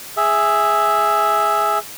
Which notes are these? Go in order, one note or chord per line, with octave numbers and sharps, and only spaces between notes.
G#4 E5